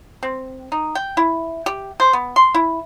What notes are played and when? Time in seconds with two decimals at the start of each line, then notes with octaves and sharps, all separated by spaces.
0.23 C4
0.72 D#4
0.95 G5
1.17 E4
1.66 G4
2.00 C5
2.13 B3
2.36 C6
2.55 E4